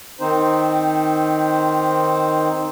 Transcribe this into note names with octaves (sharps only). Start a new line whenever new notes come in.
D#3 C4 D#4 C5